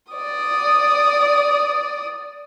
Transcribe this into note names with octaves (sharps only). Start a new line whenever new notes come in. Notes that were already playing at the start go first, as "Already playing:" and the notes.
D5 D#6